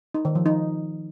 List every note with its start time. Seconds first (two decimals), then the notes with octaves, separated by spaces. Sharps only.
0.14 D#4
0.25 D#3
0.35 F3
0.46 D#4